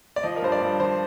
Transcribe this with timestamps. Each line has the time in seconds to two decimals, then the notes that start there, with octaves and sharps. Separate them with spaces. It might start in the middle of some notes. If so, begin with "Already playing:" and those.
0.16 D5
0.23 F3 D#5
0.36 A#4
0.42 G2 C5
0.52 D5
0.61 G2
0.80 F3 C5